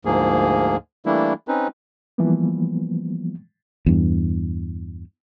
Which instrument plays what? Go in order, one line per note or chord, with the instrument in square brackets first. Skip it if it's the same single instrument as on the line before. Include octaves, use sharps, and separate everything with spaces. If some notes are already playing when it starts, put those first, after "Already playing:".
[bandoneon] D2 G#2 F3 A#3 G#4
E3 G3 A3 A#3 D4 E4
C4 C#4 D#4 B4
[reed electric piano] E3 F3 G3 A#3 B3
[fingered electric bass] E2 G2